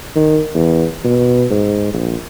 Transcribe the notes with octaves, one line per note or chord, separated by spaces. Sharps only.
D#3
E2
B2
G#2
A#1